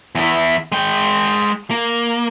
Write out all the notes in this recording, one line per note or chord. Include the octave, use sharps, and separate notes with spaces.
E2 E4
G#3 G5
A#3